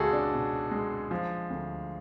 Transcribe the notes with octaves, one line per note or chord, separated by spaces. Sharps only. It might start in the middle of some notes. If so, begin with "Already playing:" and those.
Already playing: C#2 G#3 F#4 G#4 A4
D4
B2
G#3
F3
D2